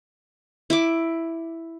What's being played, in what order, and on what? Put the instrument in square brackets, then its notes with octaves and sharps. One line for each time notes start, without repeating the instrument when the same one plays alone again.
[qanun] E4 D6